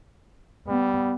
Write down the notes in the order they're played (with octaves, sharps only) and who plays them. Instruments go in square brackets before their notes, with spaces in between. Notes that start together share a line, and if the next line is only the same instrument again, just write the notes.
[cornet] G3 [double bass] B3